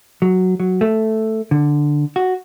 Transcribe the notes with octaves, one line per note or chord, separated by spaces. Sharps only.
F#3
F#3
A3
D3
F#4